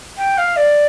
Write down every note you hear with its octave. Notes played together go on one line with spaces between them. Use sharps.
G5
F5
D5